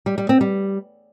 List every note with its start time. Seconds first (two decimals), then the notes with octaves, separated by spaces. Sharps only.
0.06 G3
0.18 G3
0.29 C4
0.41 G3